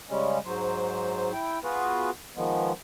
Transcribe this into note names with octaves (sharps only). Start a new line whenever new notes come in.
C#3 G3 G#3 C#4
G#2 F#3 C5
E4 G5
B3 F4 F#4 G#4 B4
D#3 F3 G#3 B3